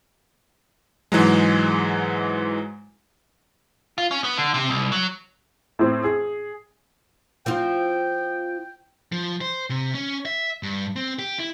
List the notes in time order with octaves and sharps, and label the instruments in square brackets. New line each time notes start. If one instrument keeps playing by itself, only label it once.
[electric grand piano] G#2 E3 F#3 G#3
[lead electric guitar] F4
C#4
B3
D3
C3
C2
F#3
[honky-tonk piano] A2 C4
G#4
[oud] F3 C4 F4 [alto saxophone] G5
[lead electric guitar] F3
C5
C3
C#4
E5
G2
C4
G4
E4